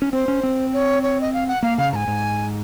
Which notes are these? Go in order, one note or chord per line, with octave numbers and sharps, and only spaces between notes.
C#4
C4 C5
C#4
C4
C#5
C#5
D#5
F5
F#5
A#3 F5
C#3 F5
G#2 G#5 A#5
G#2